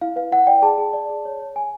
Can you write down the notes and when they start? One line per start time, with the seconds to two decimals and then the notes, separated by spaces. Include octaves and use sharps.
0.01 E4 F5
0.16 B4 F5
0.32 E4 F#5
0.47 D5 G5
0.62 G#4 A5
0.78 G#4
0.93 D5
1.10 G#4
1.25 C#5
1.40 C#5
1.55 C#5 G#5